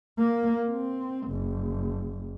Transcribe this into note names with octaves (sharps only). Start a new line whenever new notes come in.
A#3
C4
F#1